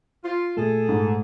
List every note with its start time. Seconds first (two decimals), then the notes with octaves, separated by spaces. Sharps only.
0.24 F4
0.57 A#2 A3 G#4 A4
0.89 G#2